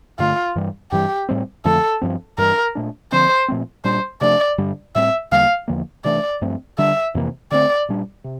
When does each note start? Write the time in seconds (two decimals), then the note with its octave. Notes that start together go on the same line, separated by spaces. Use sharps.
0.19 G2 D3 A3 F4
0.56 G2 E3 G3
0.91 G2 E3 G3 G4
1.29 A2 G3 C4
1.65 F2 D3 F3 A3 A4
2.02 G2 F3 C4
2.38 G2 E3 G3 D4 A#4
2.75 A#2 A3 D4
3.12 D3 F3 C4 C5
3.48 A#2 F3 A3 C4
3.84 A#2 G3 D4 C5
4.21 C3 F3 A3 D4 D5
4.58 G2 D3 G3 D4
4.95 A2 G3 C4 E5
5.32 E2 D3 G3 A#3 F5
5.68 E2 D3 F3 A#3
6.04 C3 E3 A3 D4 D5
6.41 G2 F3 A3 C4
6.78 D3 G3 D4 E5
7.15 F2 C3 E3 A#3
7.51 D3 A3 C4 D5
7.89 A#2 G3 D4
8.24 C3